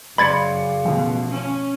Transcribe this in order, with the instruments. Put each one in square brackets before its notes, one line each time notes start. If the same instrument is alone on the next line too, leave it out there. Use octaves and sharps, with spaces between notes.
[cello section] F#2 [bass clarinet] C#3 [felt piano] D5 C6 C#7 [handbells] B5 G#6 A6
[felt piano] A1 F3 [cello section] B2
[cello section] C#4